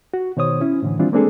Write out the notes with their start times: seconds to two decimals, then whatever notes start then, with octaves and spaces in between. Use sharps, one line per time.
0.14 F#4
0.37 B2 D#3 C5 C#5 D#6
0.61 C#4 E4
0.82 A2 D3 E3
0.99 D#3 E3 G3 C4 D4 F4
1.12 G#3 A#3 C4 D4 G#4 A4